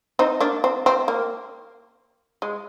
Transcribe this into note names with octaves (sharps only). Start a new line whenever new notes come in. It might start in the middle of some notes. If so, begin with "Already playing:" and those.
C4 D#4
A#3 D4
C4
C4
A#3
G#3